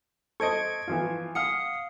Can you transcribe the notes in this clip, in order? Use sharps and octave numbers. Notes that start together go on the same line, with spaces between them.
A4 C5 D#5 C#6 G#6 D7
E3 F3 F4
F5 F#5 D#6 F6 C#7